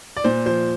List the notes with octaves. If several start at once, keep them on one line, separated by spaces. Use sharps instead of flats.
D5
A#2 C5
F3 C5